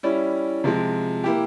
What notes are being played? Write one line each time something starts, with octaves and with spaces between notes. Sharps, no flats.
G3 C#4 E4
C3 F3 G#3
A#3 E4 G4